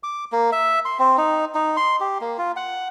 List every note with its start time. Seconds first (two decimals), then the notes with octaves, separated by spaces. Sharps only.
0.03 D6
0.32 A#3
0.52 E5
0.85 C6
0.99 C4
1.17 D#4
1.55 D#4
1.77 C6
2.00 G4
2.21 A#3
2.38 F4
2.56 F#5